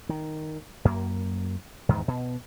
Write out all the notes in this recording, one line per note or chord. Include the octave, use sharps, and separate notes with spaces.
D#3
F#2 A#3
E2 G#2 D#3
B2